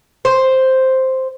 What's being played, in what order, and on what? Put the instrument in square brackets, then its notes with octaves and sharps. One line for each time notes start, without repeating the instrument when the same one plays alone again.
[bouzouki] C5